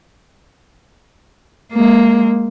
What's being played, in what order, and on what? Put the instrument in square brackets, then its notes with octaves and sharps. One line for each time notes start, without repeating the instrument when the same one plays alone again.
[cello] G#3 A#3